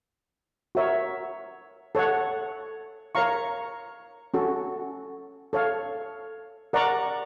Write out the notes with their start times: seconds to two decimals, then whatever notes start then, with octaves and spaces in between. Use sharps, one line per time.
0.75 F#4 A#4 C#5 E5
1.95 A4 C#5 F#5
3.15 A#4 C#5 F5 A#5 C#6
4.34 C#4 F#4 A4
5.53 A4 C#5 F5
6.73 A#4 D5 F#5 A#5 C#6